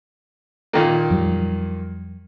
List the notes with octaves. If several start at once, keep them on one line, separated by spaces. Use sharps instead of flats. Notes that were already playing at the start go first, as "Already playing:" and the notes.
A#2 D#3 A#3
F2 F#3 G3